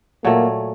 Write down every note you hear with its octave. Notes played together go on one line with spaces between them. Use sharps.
A#2 F#3 A3 A#3